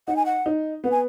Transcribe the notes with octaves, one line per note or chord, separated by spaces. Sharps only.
D#4 F#5
G#5
F#5
D#4
B3 F#5
G#5